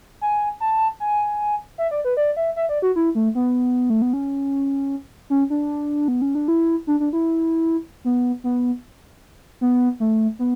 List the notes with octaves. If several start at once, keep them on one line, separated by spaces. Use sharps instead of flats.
G#5
A5
G#5
E5
D5
B4
D5
E5
E5
D5
F#4
E4
A3
B3
A3
B3
C#4
C#4
D4
B3
C#4
D4
E4
D4
D4
E4
B3
B3
B3
A3
B3